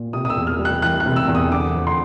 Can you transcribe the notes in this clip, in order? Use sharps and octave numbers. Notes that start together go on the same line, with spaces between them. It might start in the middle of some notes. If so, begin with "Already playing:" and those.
Already playing: A#2
C3 D#6
D#6
E6
E2
F6
G3
F#6
E3 F#6
F#6
C3
E6
E2
D#6
D3 D6
F2
C6